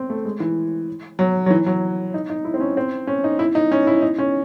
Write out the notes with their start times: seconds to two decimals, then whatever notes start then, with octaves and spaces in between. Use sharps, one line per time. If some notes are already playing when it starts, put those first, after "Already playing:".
Already playing: C4
0.10 A3
0.25 G#3
0.40 E3
1.19 F#3
1.46 F#3
1.51 E3
1.66 F#3
2.14 D#4
2.30 D#4
2.45 E4
2.54 C4
2.61 C#4
2.77 C4
3.07 C#4
3.24 D#4
3.39 E4
3.55 D#4
3.72 C#4
3.87 E4
4.02 D#4
4.18 C#4